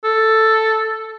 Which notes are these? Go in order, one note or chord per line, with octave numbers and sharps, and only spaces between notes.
A4